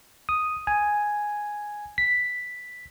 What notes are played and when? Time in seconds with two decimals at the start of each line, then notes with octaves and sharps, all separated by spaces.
0.29 D#6
0.67 G#5
1.98 B6